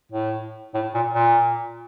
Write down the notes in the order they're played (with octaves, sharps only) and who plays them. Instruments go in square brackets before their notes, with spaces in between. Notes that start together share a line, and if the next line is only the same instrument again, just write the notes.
[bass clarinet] A2
A2
A#2
A#2